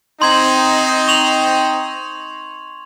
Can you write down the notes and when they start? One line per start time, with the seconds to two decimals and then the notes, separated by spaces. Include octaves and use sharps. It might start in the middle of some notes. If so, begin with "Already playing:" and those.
0.22 C4 D#4 C6 G#6 F#7
1.08 C#6 F7 F#7